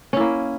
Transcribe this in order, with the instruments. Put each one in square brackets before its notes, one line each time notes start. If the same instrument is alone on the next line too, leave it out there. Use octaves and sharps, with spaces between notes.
[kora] C#4
E4
A#3